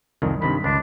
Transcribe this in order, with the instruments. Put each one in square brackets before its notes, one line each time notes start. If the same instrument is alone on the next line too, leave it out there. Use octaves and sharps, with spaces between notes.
[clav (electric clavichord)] C2 F2 D#3
[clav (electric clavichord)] G2 C3 D#3 [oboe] B5
[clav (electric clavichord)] C#2 [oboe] D4